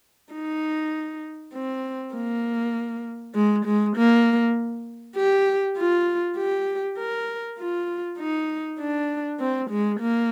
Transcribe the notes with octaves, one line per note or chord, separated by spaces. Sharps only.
D#4
C4
A#3
G#3
G#3
A#3
G4
F4
G4
A#4
F4
D#4
D4
C4
G#3
A#3